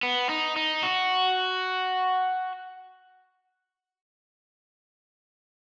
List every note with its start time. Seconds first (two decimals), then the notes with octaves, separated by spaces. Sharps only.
0.03 B3
0.29 D#4
0.56 D#4
0.83 F#4